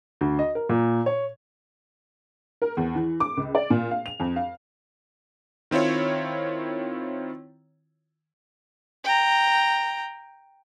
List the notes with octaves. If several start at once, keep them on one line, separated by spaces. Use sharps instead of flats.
D2
D#5
A#4
A#2
C#5
A#4
E2
E3
D6
C#2
D5
A#2
F5
F7
F2
F5
D#3 C4 E4 F4 C#5
G5 A#5